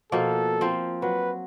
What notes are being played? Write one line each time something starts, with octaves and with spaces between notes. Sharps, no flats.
B2 F3 A#3 A4
F3 C4
F#3 B4